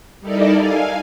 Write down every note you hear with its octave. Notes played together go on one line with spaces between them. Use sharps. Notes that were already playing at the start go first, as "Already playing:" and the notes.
G3 D#4 E4 A4 A#4 D5
F5 G#5